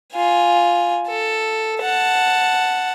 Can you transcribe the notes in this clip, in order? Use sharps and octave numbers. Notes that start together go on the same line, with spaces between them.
F4 G#5
A4
F#5 A5